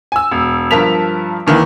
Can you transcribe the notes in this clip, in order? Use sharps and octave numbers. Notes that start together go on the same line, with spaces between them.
G#5 E6
E1
G2 F3 A#4 A5 B6 F7
D#2 D#3 E3